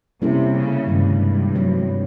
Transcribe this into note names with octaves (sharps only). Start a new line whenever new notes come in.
C3 G3 A#3 C#4 E4 A4
C#3
G2 C3 D#3 G#3
F#3 A3 C4